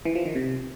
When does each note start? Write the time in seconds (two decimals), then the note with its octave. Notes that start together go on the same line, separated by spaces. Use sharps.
0.05 E3
0.15 F3
0.25 D#3
0.35 C3